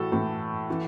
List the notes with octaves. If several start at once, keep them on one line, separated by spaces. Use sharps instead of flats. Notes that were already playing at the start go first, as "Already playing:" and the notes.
Already playing: A2 E3 F#4 A4
A2 E3
E3